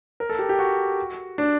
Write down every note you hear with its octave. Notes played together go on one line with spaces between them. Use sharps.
A#4
A4
G4
G4
F#4
D4